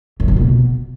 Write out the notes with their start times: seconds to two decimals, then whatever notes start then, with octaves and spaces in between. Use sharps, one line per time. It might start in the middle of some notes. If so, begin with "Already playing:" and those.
0.20 F#2
0.28 C3
0.36 B2